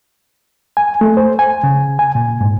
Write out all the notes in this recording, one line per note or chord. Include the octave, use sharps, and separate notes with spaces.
G#5
A3
C5
G#5
C#3
G#5
A#2
G#2